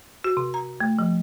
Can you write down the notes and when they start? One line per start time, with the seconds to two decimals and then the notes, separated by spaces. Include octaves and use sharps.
0.24 F#4
0.37 C3
0.54 A#5
0.80 A3
0.99 F3